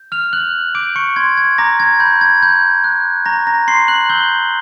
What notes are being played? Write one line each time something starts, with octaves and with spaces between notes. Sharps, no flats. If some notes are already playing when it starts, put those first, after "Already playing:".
Already playing: G6
F6 F7
F#6 G6 F#7
D6 G6 D7
C#6 C#7
C6 G#6
G#6
A#5 D6 A#6
G#6
B5 G6
G#6
B5 G6
F#6
A#5 C#6 A#6
A#5 A#6
C6 C#6 C7
F#6 F#7
E6 G6 G7